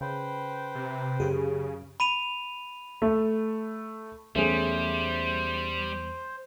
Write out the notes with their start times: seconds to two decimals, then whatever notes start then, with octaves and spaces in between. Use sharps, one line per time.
0.01 C#3 B4 C5 G5
0.75 C3
1.20 F#2 C#3 G4 G#4
2.00 B5 D#7 F7
3.02 A3
4.35 E2 G3 A3 C#4 G#4 C5